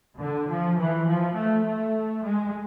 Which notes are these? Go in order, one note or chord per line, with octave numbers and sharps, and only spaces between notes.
D3
F3
E3
F3
A3
A3
G#3